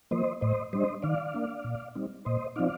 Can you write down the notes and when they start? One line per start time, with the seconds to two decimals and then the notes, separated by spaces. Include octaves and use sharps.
0.11 F3 A#3 C5 D#5
0.41 A2 C5 D#5
0.73 G3 D4 C5 D#5
1.02 D#3 D5 F5
1.34 A#3 D4
1.64 A#2
1.95 G3 C4 D#4
2.25 A#2 C5 D#5
2.56 F3 C4 D#4 D5 F5